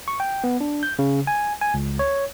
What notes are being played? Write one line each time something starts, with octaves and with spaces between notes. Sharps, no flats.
C#6
G5
B3
D4
G6
C#3
G#5
G#5
C#2
C#5